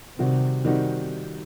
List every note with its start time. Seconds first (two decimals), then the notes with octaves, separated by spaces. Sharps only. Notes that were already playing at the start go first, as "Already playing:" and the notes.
0.18 C3 D#3 G3 C4 D#4 F#4
0.65 D#3 G3 C4 D#4 F#4